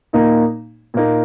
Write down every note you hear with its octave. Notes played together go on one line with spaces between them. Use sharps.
A#2 A#3 D#4
A#2 A#3 D#4